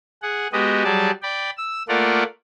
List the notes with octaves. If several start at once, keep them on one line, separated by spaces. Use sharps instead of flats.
G#4 F#5
G#3 B3 F#4 G4 D#5
F#3 G3 G#4 D5 A5
D5 G5 B5
E6
A3 A#3 F4 A#4 D5 F#5